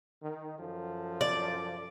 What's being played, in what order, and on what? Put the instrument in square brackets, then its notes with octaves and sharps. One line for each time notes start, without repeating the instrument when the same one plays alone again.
[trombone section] D#3
F#2 F3 A4
[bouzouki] D5